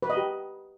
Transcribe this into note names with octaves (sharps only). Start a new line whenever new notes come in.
B4
D#5
G4